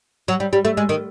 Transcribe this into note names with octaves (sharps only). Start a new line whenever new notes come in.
F#3
G3
G3
A3
G#3
D#3